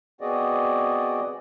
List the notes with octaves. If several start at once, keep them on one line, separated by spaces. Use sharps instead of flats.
B3 C4 F#4 G#4 D5 D#5